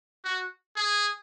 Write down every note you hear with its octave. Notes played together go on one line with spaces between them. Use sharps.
F#4
G#4